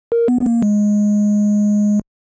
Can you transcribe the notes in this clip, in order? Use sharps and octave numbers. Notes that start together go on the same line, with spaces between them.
A#4
B3
B3
A#3
G#3